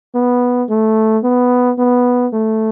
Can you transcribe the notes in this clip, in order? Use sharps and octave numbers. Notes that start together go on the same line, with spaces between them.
B3
A3
B3
B3
A3